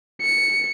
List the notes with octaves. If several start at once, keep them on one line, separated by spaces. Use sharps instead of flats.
C#7